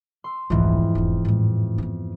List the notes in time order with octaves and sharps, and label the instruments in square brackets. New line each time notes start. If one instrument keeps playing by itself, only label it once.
[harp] C6 E6
[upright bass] F1 C2 [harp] F2 G#2 E3
[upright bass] E1 F3
A2 G#3
B3 F4